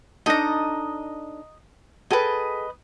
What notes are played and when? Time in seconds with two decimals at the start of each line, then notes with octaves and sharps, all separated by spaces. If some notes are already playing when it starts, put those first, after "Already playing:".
0.26 D4 D#4 A4 D#5 A#5
2.11 G#4 A4 B4 D#5 G5